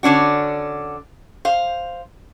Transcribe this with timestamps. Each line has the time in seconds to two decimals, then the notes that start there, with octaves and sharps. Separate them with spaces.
0.03 D3 C#4 D4 F#4
1.45 C5 F5